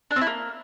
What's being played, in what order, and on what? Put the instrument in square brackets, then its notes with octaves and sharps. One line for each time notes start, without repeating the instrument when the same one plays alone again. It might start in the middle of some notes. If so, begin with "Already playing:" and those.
[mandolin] D4
C4
E4
A#3